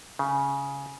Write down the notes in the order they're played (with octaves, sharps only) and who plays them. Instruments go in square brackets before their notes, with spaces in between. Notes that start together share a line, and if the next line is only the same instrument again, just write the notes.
[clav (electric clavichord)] C#3